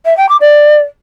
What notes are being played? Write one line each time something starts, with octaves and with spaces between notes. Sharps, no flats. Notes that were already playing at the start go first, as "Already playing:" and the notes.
E5
G5
D6
D5